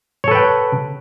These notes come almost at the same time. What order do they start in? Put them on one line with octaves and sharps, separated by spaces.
C#5 A4 B4 G5